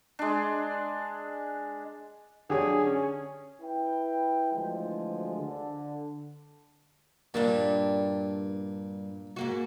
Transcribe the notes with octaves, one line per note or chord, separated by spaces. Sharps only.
G#3 D4
D3 G4 G#4 C#5
C#4
E4 B4 G5
D2 E3 F3 G#3
D3
G2 A#2 G3 D4
G#2 A#3 F#4